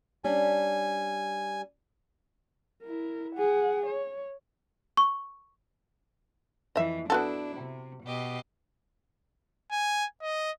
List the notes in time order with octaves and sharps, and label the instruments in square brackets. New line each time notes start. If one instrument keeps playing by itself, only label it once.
[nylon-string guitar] G3 C#4 D4 [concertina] G#5
[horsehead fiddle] E4 A#4
G#4 F#5
C#5
[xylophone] C#6
[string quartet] F2 E3 [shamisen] D#5 E5
[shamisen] B3 F#4 A4 [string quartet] D4 E4
[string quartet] C3
B2 G4 D#5
[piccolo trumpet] G#5
D#5